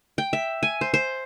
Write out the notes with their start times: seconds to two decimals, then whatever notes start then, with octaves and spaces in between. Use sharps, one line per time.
0.18 G5
0.33 E5
0.63 G#5
0.81 C5
0.94 C5